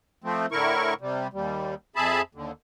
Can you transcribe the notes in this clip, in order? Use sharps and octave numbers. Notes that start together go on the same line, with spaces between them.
F3 A3 C4
A2 D3 E4 A#4 C#6
C3 G3
D#2 G3
F2 G#4 E5 A5 B5
D#2 D3